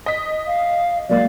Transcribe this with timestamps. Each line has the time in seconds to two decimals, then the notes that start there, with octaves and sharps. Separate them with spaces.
0.06 D#5 B6
0.47 F5
1.10 F#3 G#3 A#3 D5 F5